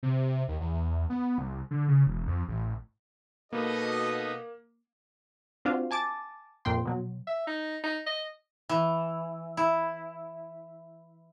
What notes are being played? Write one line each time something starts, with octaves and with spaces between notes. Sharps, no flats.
C3
D#2
E2
B3
C2
D3
C#3
E1
F2
A1
B2 A#3 B3 D#4 F#4 A4 D#5
C4 D4 F4 F#4 C5 F5
G#5 A5 D6 A6
F2 A#2 G5 C6
B2 F#3
E5
D#4
D#4
D#5
E3
E4